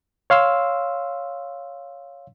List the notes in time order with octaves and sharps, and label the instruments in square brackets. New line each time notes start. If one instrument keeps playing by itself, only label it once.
[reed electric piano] C#5 F5 C6 E6